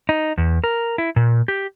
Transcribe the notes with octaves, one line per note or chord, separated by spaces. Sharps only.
D#4
E2
A#4
E4
A#2
G4